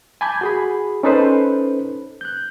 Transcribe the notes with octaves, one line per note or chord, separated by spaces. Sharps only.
G#5 A5 B5 D6 G6 G#6
F#4 G#4 B5
C#4 D#4 A4 B4 C5
F#6 G6